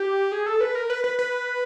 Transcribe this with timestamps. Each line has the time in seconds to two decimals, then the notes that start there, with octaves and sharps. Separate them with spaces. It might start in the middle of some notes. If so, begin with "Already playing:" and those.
Already playing: G4
0.32 G#4
0.46 A4
0.61 B4
0.75 A#4
0.90 B4
1.04 B4
1.19 B4